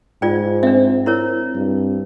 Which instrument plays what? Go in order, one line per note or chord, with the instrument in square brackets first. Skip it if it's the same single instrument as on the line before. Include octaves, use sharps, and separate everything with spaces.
[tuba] G#2 [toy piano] F4 D5 G5
[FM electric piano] C4 [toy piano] D4 E5
[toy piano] E4 A#4 C#5
[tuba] G2